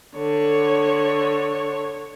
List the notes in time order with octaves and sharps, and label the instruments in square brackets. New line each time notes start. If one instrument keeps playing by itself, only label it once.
[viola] D3 C#5